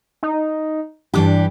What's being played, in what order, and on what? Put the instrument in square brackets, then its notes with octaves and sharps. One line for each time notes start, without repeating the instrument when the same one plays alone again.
[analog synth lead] D#4
[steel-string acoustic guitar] G2 E3 G4 [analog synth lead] D4